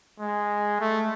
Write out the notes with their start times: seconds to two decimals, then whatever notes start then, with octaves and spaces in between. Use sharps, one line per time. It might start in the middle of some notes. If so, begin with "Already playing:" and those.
0.20 G#3
0.81 A3